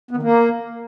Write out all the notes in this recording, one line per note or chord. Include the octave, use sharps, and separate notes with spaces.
B3
D#3
A#3